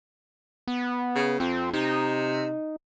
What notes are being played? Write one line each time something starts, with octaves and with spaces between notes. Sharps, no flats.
B3
C#3
F2 C4
C3 D#4